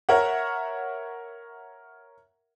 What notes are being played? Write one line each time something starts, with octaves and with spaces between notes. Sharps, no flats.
A#4 C#5 E5 F#5